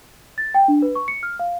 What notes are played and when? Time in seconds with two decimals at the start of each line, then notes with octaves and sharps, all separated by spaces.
0.38 A6
0.54 G5
0.68 D4
0.82 B4
0.95 C#6
1.08 C#7
1.23 F6
1.39 F5